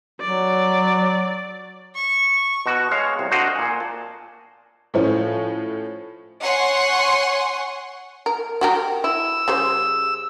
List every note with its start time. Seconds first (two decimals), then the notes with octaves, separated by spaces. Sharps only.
0.21 F#3 D5
1.95 C#6
2.66 B2 F#4
2.91 G#3 C#5 F5
3.19 C2
3.31 D4 F#4 C5 D#5 F5 F#5
3.56 A#2 G#5
3.80 A5
4.94 A2 F3 C#4
6.41 C#5 F#5 G#5 C6 C#6
8.26 A#4
8.61 F#4 G4 A#4
9.04 E4 E6
9.48 C#3 G3 C5